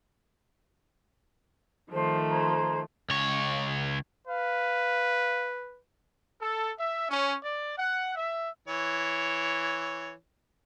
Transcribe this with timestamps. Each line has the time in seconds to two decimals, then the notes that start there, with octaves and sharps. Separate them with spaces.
1.91 D#3 F3 A3 C5
2.30 C5 A#5 G#6
3.10 C#2 C#5
4.28 B4 F5
6.39 A4
6.78 E5
7.09 C#4
7.42 D5
7.77 F#5
8.15 E5
8.68 E3 C#5